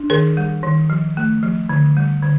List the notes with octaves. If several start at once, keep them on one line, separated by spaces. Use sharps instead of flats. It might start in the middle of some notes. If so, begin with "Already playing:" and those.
Already playing: D4
D#3 G#4 A#4
G3
D#3
F3
A3
F3
D3
G3
D3